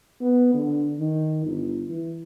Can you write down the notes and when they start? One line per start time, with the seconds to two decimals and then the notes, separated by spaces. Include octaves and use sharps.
0.21 B3
0.54 D3
0.99 D#3
1.45 G1
1.89 E3